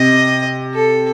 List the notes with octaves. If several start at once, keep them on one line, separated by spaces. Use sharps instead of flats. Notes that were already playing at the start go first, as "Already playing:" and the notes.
Already playing: C3 D#5
A4